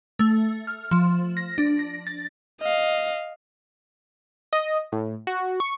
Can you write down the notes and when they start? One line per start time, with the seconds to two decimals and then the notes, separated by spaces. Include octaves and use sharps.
0.19 A3
0.67 F6
0.91 F3
1.37 A#6
1.58 D4
1.79 A#6
2.07 A6
2.61 D#5 F5
4.53 D#5
4.92 A2
5.27 F#4
5.60 C#6